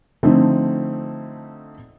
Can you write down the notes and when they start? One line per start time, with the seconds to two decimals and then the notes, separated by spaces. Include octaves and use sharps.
0.23 D3 F3 A3 C4 D#4